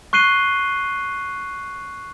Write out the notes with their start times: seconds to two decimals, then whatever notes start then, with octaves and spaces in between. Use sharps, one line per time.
0.13 C#6 F#6 C7 D#7 G7